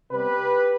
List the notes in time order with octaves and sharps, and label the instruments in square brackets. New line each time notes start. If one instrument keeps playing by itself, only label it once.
[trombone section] C3 G3 B3 G4 B4